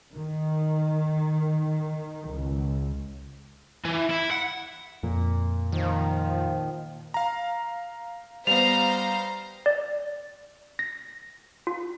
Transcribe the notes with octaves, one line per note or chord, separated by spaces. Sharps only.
D#3
C#2
E3
E4
F#5
F2 A#2
D#3 F3
F5 A#5
G3 B3 C5 F5 A#5 F7
D5
A#6
F4